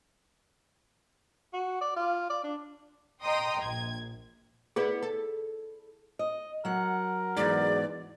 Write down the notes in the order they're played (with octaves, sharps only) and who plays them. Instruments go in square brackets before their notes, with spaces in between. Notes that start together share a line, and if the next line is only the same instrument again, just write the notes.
[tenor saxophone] F#4
D5
F4
D5
D4
[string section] D#5 G5 A#5 C6 D#6
A#1 G#6
[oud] B3 E4 B4 [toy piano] G#4 D5
[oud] A4
[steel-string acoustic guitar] D#5
[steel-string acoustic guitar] F#3 F#5 [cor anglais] A#4
[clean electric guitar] E2 G#2 [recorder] D5